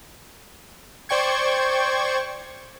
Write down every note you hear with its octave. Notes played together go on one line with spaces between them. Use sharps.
C5 D5 G5 C#6 G#6